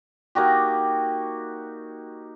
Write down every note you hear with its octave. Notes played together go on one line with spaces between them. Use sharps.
A#3 D#4 F#4 G4